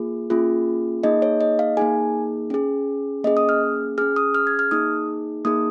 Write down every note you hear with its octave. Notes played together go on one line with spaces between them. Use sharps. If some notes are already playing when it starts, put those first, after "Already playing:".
Already playing: A#3 F4 G#4
A#3 C#4 F4 G#4
A#3 D#4 G#4 D#5
C#5
D#5
F5
A#3 D#4 G#4 G#5
C#4 G#4
A#3 C#4 G#4 D#5
D#6
F6
C#4 G#4 F6
D#6
F6
G#6
F6
A#3 D#4 G#4 D#6
A#3 D#4 G#4 D#6